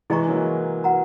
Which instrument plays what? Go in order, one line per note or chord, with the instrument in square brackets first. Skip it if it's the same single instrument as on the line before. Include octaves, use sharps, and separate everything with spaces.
[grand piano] E3 G#3 [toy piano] E4 G#4 D#5 A#5 C#6
[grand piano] F#3 A#3
[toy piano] F#4 B4 F#5 A#5